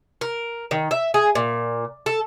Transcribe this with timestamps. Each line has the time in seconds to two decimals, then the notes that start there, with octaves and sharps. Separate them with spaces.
0.21 A#4
0.71 D#3
0.91 E5
1.14 G#4
1.35 A#2
2.06 A4